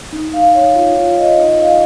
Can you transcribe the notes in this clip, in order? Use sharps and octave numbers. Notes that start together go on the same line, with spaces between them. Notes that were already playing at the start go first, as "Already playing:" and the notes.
D#4
F5
C#5
F4
F4
D#5
D#4
F5